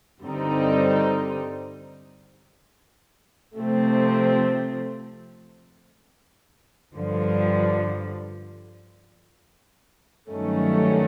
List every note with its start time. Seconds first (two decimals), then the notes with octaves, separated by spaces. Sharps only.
0.22 G2 D3 G3 C4 D#4
3.58 C3 F3 A3 C4
6.94 G2 D3 F3
10.29 G2 D#3 F#3 A3 C#4